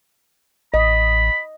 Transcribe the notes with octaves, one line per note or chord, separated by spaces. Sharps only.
A1 D#5 B5